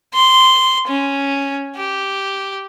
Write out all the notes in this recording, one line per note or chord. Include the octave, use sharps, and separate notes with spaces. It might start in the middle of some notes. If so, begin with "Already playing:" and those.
C6
C#4
G4